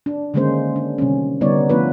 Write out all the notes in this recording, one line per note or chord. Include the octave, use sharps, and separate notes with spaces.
D4
D3 D#3 G#3 A#3 C#4 C5
D4
C3 D#3 G3 C#4
D3 G3 B3 D#4 C#5 D5
F3 A3 B3 D4 F4 B4